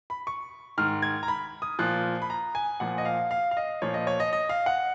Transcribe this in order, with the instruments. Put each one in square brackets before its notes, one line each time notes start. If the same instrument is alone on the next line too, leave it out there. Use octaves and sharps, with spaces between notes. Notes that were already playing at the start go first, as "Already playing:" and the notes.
[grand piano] B5
C#6
G#2 D#3 F6
G#6
A#5
B5
D#6
A#2 F3 F#6
B5
A#5
G#5
A#2 F3 F#5
D#5
F5
F5
F5
D#5
A#2 F3 C#5
D#5
C#5
D#5
D#5
F5
F#5